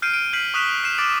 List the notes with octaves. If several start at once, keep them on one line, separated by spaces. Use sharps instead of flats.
F6 G6 C7 D7 D#7
D7 D#7
F6 G6 B6 C7 F#7
C#6 D#6 F#6 B6 E7 G7
F6 C7 D7 E7
D6 F6 A6 D7 F#7